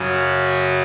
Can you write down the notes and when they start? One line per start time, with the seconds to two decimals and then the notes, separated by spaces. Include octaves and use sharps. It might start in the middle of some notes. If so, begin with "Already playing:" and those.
Already playing: F#2 C#3 F#3
0.12 F#4